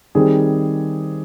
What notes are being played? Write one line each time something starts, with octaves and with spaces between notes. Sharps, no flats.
D#3 G3 C4 G#4